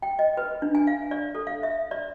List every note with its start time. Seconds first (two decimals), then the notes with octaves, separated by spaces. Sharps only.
0.02 G5
0.19 D#5
0.37 B4
0.62 D4
0.75 G#5
0.87 F5
1.11 D5
1.35 A4
1.47 F5
1.63 E5
1.91 D5